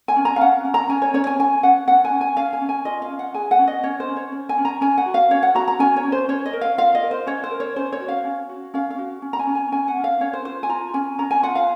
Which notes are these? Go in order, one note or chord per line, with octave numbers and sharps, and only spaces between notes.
G#5
C#4
A#5
F5
C#4 F#5
C#4
A#5
C#4 G#5
C#5
C#4 C#5
G#5
C#4 G#5
C#4 F#5
C#4 F#5
G#5
C#4
G#5
C#4 F5
G#5
C#4
G#5
F4 D#5
F5
C#4
F#5
G#4 G#5
F#5
C#4
D#5
C#4 C#5
C5
C#4
C#5
C#4
G#5
C#4
A#5
C#4 G#5
F#5
F#4
F5
C#4 C#5
F#5
F#4 A#5
A#5
C#4 G#5
C#5
C#4
C5
C#4 C#5
D#5
A#4
F5
F4 F5
D#5
A#4
C5
C#4 C#5
C5
A#4
C#5
C#4 C5
C#5
F#4
F5
C#4
F#4
C#4 F5
F5
F#4
C#4
A#5
G#5
C#4
G#5
C#4 G#5
F#5
C#4
F5
C#4 C#5
C5
F4 C5
G#5
F4 A#5
C#4 G#5
C#4 A#5
G#5
F4 F#5
F5